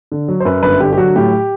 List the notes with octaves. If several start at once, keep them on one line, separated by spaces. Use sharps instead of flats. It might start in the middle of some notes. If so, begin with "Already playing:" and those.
D3
F#3
C5
F#2 B4
G1 B4
D3 G4
G4
F#3 F#4
A2 G4